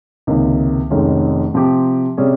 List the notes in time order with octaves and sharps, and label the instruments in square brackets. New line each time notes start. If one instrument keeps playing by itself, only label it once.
[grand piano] C#2 C3 D#3 A#3 D#4
F1 F2 D#3 G#3 C#4
C3 F3 C4 G4
C3 G3 C#4 G#4